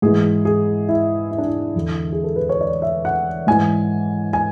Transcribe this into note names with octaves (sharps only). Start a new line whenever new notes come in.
G#2 E3 G#4
G#4
E4
E4
D4
E4
E2 D3
G#4
A4
B4
C#5
D5
E5
F#5
G#2 E3 G#5
G#5